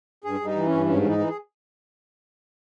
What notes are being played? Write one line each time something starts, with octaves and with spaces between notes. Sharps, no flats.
G2 G#4
G2 D#4
E3
G2 C#4
G#2 C#4
E3 C#4 D#4
E3
G#4